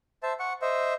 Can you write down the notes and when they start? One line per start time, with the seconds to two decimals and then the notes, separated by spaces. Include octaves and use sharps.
0.23 C5 E5 A5
0.39 F#5 C#6
0.62 C5 D#5 E5